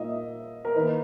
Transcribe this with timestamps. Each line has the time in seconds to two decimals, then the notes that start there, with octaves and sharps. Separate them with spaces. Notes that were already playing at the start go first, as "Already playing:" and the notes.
Already playing: A#2 A#3 D#4 D#5 E5
0.65 A#4
0.75 D#3 A#3 D#4 B4